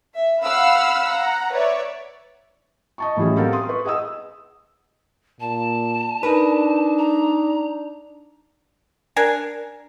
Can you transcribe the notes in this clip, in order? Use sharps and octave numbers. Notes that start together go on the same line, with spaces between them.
E5
F5 F#5 B5 E6 F6
F#5 A#5
B4 C#5 D5 E5
D#5 A5 C#6
A2 E3 F#3 G3 C#4 G#4
G3 B3 C4 A4 A#4 F5
C6 D#6
B4 C#6
G#4 D#5 F#5 D#6 E6
A#2 A5
D4 D#4 A#4 B4
A#5
D4 A#4 G#5